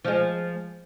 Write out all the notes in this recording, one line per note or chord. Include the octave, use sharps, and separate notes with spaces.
F3 G#3